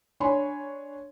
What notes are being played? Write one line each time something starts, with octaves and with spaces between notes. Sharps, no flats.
D4 C#5 G#5 B5 C6